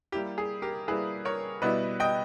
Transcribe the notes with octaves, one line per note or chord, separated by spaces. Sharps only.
G3 A#3 E4 G4
G#4
G4 A#4
G3 A#3 E4 G#4 B4
A#4 C#5
B2 G3 B3 E4 B4 D#5
D#5 G5